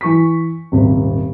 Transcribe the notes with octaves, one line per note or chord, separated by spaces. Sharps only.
E3 C#6 B6
D#1 G#1 C3